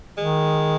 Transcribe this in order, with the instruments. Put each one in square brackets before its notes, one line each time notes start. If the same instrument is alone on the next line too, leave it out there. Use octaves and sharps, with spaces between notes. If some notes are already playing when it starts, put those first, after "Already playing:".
[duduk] D#3 [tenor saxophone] G#3